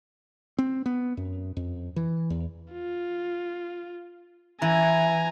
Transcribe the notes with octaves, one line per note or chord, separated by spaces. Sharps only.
C4
B3
F#2
F2
E3
E2
F4
E3 G#5 A#5